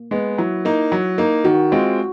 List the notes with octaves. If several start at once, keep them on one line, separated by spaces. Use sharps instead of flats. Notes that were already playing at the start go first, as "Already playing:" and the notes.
Already playing: A#3
G#3 B3
F#3 E4
A#3 D#4
F#3
A#3 D#4
D#3 F#4
G#3 C4 F4